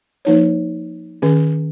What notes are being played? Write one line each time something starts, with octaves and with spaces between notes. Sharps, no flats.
F3 A#3 D#4 C#5
D#3 C#4 G#4